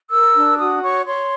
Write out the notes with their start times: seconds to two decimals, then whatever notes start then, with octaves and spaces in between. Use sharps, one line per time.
0.10 A#4 E6
0.35 D4
0.58 F#4 D#6
0.82 C#5 C#6
1.05 C#5 C6